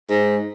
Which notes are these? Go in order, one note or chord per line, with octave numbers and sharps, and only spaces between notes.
G#2